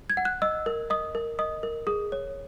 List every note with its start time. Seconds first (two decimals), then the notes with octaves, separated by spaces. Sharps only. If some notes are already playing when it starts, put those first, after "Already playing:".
0.10 G#6
0.17 F#5
0.25 F#6
0.42 D#5 E6
0.66 A#4
0.90 D#5 D#6
1.15 A#4
1.39 D#5 D#6
1.63 A#4
1.87 G#4 D#6
2.12 C#5